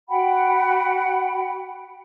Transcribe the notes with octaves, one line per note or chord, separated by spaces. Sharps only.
F#4 F#5 G5 B5